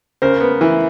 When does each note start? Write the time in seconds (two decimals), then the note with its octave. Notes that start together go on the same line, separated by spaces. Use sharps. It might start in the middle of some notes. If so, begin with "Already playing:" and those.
0.22 C#3 A#4 C5
0.40 B3
0.61 E3